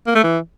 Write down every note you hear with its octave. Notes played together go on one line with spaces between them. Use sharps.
A#3
A3
E3